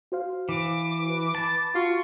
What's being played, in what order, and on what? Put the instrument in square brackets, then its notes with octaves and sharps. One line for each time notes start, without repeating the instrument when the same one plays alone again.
[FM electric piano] F#4 C5 F5
[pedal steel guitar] E3 [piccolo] D6
[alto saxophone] B4
[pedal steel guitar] A5 [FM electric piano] B5
[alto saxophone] F4 [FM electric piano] F#4 [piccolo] C#6